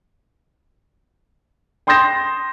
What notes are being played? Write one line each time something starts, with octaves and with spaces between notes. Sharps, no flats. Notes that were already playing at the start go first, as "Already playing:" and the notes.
G5 C6 D#6 G6 A#6 E7